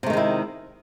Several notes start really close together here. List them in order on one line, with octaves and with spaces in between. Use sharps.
C3 A3 D#3 G#3 E4